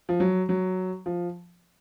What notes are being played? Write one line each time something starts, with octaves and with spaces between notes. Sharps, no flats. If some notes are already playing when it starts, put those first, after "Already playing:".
F3
F#3
F#3
F3